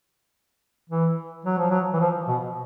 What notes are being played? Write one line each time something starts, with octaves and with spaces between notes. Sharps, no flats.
E3
F#3
F3
F#3
E3
F3
B2